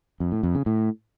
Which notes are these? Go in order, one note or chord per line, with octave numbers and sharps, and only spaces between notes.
F2
A2
F2
C#3
A2